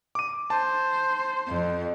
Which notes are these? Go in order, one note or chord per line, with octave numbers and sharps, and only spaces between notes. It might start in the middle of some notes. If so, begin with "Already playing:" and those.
D6 D#7
C5 A5
F2